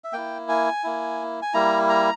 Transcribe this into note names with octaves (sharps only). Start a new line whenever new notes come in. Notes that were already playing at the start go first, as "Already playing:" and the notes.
E5
A#3 E4 G5
G#5
A#3 E4
G#5
G3 A#3 E4 A#5
A#5